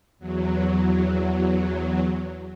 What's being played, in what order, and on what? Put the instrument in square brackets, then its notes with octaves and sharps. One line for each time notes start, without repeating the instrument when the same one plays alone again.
[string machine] E2 F#3